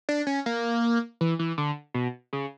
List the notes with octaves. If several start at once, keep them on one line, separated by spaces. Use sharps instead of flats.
D4
C#4
A#3
E3
E3
D3
B2
C#3